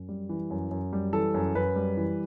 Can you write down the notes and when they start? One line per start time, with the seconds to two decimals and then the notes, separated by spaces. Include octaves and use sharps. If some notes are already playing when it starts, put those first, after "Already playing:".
Already playing: F#2
0.09 G3
0.29 E3
0.50 F#2
0.71 F#2
0.93 G3
1.13 E3 A4
1.34 F#2
1.55 F#2 B4
1.76 G3
1.97 E3